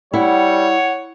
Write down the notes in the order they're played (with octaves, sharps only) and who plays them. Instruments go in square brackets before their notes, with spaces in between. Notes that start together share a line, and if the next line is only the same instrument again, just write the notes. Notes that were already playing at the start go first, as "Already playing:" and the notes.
[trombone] G3 [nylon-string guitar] E4 [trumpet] C#5 [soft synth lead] F#5